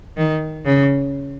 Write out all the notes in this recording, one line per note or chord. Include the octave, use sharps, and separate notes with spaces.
D#3
C#3